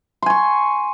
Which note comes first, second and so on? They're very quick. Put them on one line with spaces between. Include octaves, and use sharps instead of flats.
C6 G#5 C#6